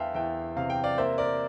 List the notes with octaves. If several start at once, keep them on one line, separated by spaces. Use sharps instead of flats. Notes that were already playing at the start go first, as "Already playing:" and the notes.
Already playing: E2 E3 E5 F5 G5 A5 C6
E2 E5 G5
C3 F5
G5
D5 F5
A#3 C5 E5
A#4 D5